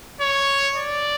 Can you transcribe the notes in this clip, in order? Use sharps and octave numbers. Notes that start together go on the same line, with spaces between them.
C#5
D5